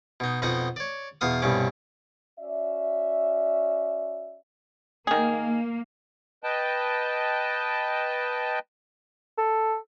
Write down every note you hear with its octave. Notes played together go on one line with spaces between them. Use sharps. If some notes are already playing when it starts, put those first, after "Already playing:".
B2 D#4
F2 B2 D#4 D#5 F#5
C#5 D5
E2 B2 F5 D#6
C2 G2 B2 C#4 D6
C#4 F#4 D5 E5
D#3 A#3 G#4
B4 D#5 G5 A5
A4